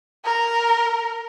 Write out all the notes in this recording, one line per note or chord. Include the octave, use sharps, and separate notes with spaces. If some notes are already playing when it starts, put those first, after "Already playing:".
A#4